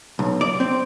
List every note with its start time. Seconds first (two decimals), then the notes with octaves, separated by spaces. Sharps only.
0.19 B1
0.41 D5
0.60 C4